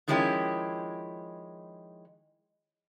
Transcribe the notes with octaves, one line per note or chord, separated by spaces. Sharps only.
D#3 F3 G#3 C#4 E4 G4